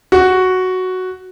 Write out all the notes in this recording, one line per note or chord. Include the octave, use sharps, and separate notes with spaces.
F#4